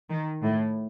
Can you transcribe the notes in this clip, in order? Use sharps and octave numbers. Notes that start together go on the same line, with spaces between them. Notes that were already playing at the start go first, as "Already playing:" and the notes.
D#3
A2